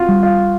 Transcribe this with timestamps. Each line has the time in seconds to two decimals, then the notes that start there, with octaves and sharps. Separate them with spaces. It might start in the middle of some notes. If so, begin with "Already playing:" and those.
Already playing: C4 F4 F#4
0.09 G3
0.23 F4